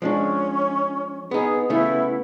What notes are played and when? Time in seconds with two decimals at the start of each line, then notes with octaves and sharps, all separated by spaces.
0.02 F3 G#3 C#4 D4
1.31 B3 D#4 G#4
1.70 C#3 A3 B3 E4